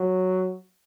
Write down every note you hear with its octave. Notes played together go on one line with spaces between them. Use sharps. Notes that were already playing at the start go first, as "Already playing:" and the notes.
Already playing: F#3